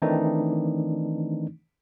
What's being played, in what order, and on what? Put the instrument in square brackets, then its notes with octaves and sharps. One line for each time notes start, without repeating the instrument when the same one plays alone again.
[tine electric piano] D#3 E3 A3 C4 D4 D#4